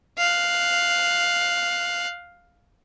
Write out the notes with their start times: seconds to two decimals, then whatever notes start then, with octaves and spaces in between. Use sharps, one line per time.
0.18 F5 F#6